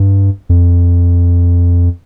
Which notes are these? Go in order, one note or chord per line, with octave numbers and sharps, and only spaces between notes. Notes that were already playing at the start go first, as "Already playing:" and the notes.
Already playing: G2
F2